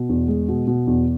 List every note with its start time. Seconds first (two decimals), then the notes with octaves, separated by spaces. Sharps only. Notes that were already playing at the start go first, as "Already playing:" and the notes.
Already playing: B2
0.09 E2
0.28 G#3
0.49 B2
0.67 B2
0.87 E2